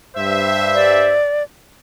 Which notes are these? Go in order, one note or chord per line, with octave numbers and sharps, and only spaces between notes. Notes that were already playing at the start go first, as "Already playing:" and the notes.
G2 C5 E5
D5